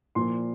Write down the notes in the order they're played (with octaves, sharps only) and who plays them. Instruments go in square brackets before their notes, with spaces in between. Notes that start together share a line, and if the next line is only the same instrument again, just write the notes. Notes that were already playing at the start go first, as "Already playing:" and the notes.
[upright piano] A#2 F3 C6